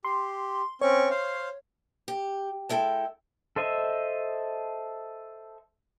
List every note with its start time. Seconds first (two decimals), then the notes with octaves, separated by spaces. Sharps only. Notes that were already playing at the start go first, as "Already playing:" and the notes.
0.05 G4 C6
0.81 C4 C#4 C#5 C#6
1.10 C5 F5
2.08 G4
2.69 G#3 E4 A4 G5
3.56 A4 C5 D#5 E5